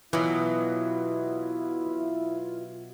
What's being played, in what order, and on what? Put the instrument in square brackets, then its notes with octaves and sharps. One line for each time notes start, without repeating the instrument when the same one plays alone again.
[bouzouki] B2 F#3 [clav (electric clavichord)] E3 [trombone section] E4 [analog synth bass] F4